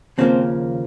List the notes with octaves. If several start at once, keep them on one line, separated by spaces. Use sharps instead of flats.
D#2 C#3 F3 A#3 C4